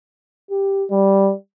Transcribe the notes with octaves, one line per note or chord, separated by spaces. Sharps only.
G4
G3